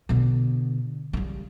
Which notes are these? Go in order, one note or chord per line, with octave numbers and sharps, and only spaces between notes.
B2 D3
C#3 G3